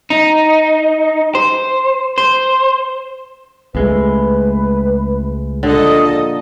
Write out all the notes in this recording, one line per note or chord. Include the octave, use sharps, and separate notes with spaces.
D#4
C5
C5
C#2 G#3 A3 B4
A#1 A#2 D3 A4 D#5